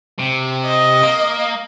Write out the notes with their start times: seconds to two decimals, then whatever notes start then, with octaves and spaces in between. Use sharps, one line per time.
0.19 C3
0.66 D#5
1.03 A#3